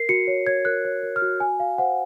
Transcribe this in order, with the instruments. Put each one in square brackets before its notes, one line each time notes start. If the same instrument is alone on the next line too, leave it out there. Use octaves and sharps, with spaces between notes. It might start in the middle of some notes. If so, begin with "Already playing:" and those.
Already playing: [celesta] A#4 C7
F#4 C#7
C#5
C#5 G#6
A#4 F#6
C#5
A#4
F6
F#4
F#4 G#5
F#4 F5
C5 F#5